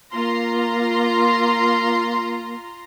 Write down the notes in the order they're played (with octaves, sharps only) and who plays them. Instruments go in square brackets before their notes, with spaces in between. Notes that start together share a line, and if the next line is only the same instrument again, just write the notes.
[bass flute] A#3 [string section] F4 A#5 C6